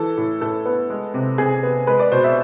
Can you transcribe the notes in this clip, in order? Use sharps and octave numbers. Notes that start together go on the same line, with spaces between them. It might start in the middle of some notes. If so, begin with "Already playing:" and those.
Already playing: E3 A4
A2
A2 A4
B3
G#3
C3
C3 G#4
B3
G#3 B4
D5
B2 C5
E5